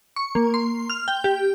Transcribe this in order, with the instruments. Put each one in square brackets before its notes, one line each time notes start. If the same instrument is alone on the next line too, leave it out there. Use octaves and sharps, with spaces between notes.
[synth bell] C#6
A#3
C6
F6
G5
G4